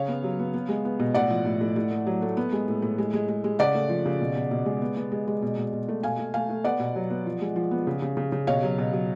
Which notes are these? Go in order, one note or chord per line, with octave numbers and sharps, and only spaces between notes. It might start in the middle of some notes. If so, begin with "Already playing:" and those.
Already playing: C#3 C#5 F5
B3
F#3
B3
B3
G#3
B3
B2
A2 D5 F#5
F3
A2
A2
A2
A3
F#3
A3
B3
G#3
A2
A2
G#3
G#3
G#3
G#3
C#3 D5 F#5
A3
F3
C#3
B2
B2
B2
G#3
B3
B3
G#3
G#3
B2
B2
B2
A3
B2 F5 G#5
A3
A3 F5 G#5
A3
B3 D5 F#5
B2
F#3
B3
F3
G#3
F3
B3
C#3
C#3
C#3
C#3
B2 C#5 F5
F#3
B2
F#3